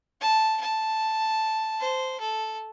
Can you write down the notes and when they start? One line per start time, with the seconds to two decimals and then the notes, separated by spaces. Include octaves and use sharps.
0.21 A5
0.61 A5
1.80 C5
2.20 A4